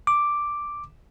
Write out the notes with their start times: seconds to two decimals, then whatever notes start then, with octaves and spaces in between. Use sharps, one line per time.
0.07 D6